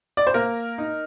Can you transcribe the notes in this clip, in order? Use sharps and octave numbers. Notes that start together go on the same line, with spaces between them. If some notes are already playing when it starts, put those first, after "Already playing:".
D5
C5
A#3 A#4
D#4